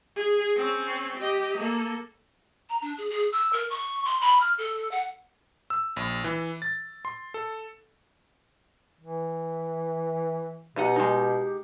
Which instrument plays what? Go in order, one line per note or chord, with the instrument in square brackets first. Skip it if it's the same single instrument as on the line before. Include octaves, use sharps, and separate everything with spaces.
[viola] G#4
C4 C#4
G4 D#5
A#3 A4
[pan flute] A#5
D4
G#4
G#4
E6
A#4
C#6
C6
B5
F6
A4
F#5
[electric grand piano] E6
A#1
E3
A6
C6
A4
[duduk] E3
[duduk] B2 [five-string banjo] B3 D#4 F#5 [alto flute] G4
[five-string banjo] G#3 D#4